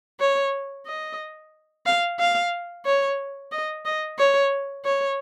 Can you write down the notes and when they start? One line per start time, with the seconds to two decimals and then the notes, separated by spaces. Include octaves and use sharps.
0.20 C#5
0.86 D#5
1.86 F5
2.19 F5
2.85 C#5
3.52 D#5
3.85 D#5
4.18 C#5
4.85 C#5